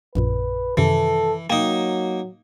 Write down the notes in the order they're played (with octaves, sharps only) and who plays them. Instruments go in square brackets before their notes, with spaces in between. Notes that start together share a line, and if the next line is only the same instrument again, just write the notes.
[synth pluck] A#1 F#2 A#2 [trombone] B4
[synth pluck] F#2 C3 D#3 [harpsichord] E3 [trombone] A4
[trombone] F#3 [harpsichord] A#3 D#4 [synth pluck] G5